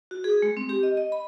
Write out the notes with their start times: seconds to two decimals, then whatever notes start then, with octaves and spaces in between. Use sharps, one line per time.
0.11 F#4
0.24 G#4
0.42 G#3
0.57 C4
0.69 G4
0.83 D#5
0.97 D#5
1.12 B5